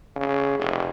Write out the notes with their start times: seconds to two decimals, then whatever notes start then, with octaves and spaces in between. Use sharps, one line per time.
0.16 C#3
0.59 F1